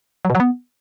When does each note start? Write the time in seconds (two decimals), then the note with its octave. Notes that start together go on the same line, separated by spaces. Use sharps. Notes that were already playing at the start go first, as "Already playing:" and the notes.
0.25 F#3
0.30 B2
0.35 F#3
0.40 B3